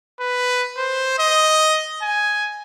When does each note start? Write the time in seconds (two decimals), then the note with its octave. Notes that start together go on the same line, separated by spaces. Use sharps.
0.20 B4
0.77 C5
1.19 D#5
2.02 G#5